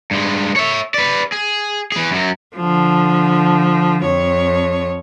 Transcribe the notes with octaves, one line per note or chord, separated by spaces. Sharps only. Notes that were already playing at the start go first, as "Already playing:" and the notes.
G2 G#3
C#5 E5
B4 D5
G#4
E3 G#4
F#2 F#3
D3 F3
F2 C#5